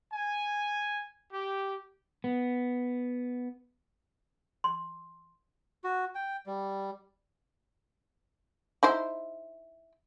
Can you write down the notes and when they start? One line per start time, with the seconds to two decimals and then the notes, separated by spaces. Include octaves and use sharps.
0.13 G#5
1.32 G4
2.24 B3
4.64 C6
5.84 F#4
6.15 G5
6.46 G3
8.83 D#4 E4 C5